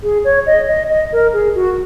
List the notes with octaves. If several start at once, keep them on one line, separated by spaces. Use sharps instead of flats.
G#4
C#5
D#5
D#5
D#5
A#4
G#4
F#4